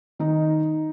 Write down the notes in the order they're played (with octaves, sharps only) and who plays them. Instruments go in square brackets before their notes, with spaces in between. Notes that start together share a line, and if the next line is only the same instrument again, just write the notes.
[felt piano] D#3 D#4